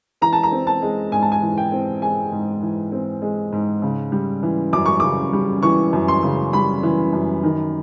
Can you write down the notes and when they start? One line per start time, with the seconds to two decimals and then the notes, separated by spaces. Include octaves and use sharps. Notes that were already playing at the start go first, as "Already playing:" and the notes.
0.22 E3 A#5
0.33 A5
0.43 A#5
0.52 C4
0.67 A5
0.82 G#3
1.12 G#2 G#5
1.22 A5
1.32 G#5
1.42 E3
1.58 G5
1.72 C4
2.02 G#3 G#5
2.32 G#2
2.63 E3
2.92 C4
3.22 G#3
3.52 G#2
3.82 C#3
4.12 G3
4.43 E3
4.73 F#2 D6
4.86 C#6
5.00 C#3 D6
5.33 G3
5.63 E3 C#6
5.93 F#2
6.08 C6
6.23 C#3
6.53 G3 B5
6.83 E3
7.13 F#2
7.44 D#3